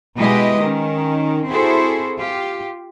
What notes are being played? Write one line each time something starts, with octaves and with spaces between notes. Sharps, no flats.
B2 G#3 E4 G4 B4 D#5
D#3 C#4
C4 E4 F#4 G#4 A4 C5
F4 G4